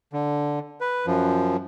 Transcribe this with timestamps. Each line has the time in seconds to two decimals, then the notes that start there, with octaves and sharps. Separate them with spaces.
0.13 D3
0.81 B4
1.06 F#2 F3